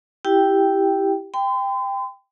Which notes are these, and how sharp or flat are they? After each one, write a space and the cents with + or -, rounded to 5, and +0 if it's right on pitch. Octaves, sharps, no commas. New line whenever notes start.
E4 +0 G4 +0 G5 +0
G5 +15 C6 -45